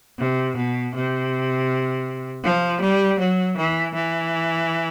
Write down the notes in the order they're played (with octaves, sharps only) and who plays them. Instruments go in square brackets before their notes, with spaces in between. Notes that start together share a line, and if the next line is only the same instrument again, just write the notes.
[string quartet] C3
B2
C3
F3
G3
F#3
E3
E3